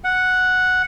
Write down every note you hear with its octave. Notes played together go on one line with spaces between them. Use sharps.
F#5